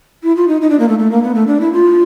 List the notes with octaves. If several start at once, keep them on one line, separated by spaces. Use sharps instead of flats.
E4
F4
D#4
D#4
D4
A#3
A3
A3
A#3
B3
A3
D4
E4
F4